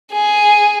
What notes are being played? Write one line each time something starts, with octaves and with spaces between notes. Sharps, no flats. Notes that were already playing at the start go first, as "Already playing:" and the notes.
G#4